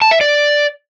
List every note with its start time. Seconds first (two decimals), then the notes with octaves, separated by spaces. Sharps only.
0.02 A5
0.11 E5
0.21 D5